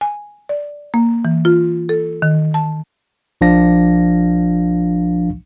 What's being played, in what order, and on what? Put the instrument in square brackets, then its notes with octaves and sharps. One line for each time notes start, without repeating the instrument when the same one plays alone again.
[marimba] G#5
D5
A#3
E3
F4
A4
D#3
A5
[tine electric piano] A#1 F3 D4 F5 A#6